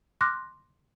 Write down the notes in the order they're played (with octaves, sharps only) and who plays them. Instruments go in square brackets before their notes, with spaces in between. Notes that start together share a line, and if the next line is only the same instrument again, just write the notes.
[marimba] C6 D6 F6 F#6 A#6